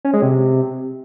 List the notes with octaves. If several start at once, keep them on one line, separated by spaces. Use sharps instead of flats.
C#4
G#3
C3